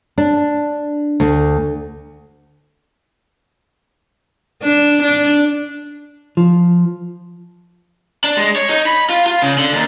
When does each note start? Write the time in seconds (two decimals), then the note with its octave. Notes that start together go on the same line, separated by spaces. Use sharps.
0.18 D4
1.20 D2
4.63 D4
5.03 D4
6.37 F3
8.24 D4
8.37 G#3
8.56 C#5
8.69 D#4
8.86 B5
9.10 F4
9.26 F4
9.42 C#3
9.58 D3
9.73 D#2